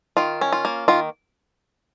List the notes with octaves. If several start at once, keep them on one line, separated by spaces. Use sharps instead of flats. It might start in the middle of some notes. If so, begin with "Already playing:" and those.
D#3 F4
C#4
F4
A#3
D#3 F4